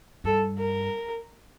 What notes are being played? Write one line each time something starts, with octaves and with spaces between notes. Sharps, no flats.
G2 A4
A#4